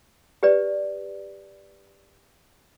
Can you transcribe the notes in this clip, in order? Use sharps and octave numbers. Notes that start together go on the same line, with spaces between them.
G4 B4 D5